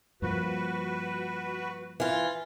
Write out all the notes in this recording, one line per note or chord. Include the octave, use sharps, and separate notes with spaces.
G2 F3 A#3 F#4 B4
E3 F4